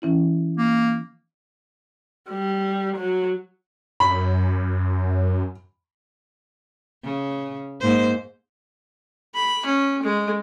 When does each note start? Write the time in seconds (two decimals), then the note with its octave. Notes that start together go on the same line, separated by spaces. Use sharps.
0.02 E3 C#4 E4
0.57 A#3
2.29 G3
2.96 F#3
4.00 F#2 B5
7.04 C#3
7.80 G#2 A#3 C5
9.34 B5
9.65 C#4
10.03 G#3